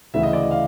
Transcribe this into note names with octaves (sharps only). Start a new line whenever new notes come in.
D2 C#3 E3 E5
D#5
D5
D#5
F5